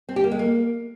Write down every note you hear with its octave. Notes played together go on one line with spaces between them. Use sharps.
C4
G4
A#3
G#3
A#3